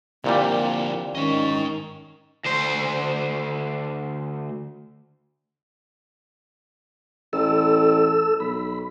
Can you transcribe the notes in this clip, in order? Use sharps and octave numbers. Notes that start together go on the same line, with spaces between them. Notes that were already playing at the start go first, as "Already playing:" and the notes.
C2 A#2 D3 F3 G3 A#3
G#2 D#3 C#4 D#5
D2 C5
A1 A4 E6
B1 B5